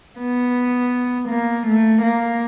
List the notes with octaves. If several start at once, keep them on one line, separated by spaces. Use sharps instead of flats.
B3
A#3
A3
A#3